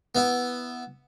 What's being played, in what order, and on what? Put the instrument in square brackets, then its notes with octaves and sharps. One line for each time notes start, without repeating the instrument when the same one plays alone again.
[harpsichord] B3 E4